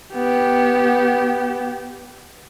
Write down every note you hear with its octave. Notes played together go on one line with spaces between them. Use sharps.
B3 G4